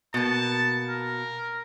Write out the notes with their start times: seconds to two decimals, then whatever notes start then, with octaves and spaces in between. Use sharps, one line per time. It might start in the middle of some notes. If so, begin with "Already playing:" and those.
0.14 B2 A#3 A5
0.89 A#4